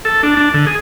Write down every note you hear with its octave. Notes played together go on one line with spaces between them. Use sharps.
A4
D4
D4
D3
G#4